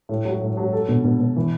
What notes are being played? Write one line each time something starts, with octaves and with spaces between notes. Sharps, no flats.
A2
F#3
A2
F#3
A4
B2
B2
B2
E3